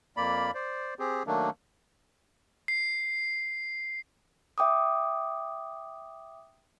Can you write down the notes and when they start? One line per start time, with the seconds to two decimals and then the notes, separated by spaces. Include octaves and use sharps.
0.17 F2 A#3 D5 B5
0.54 C5 D5
0.99 C4 G4 G#4
1.27 D#3 F#3 A3 A#3 D4
2.68 C7
4.58 E5 G5 D6 D#6